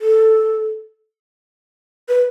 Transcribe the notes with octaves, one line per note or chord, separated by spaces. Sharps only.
A4
B4